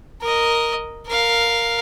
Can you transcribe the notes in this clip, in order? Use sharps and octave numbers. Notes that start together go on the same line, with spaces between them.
A#4 D#5
A#4 F5